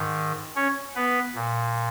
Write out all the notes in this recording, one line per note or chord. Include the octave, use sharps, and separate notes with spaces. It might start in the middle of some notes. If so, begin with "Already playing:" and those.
Already playing: G#2 D#3
C#4 C#5
B3 B4
A#2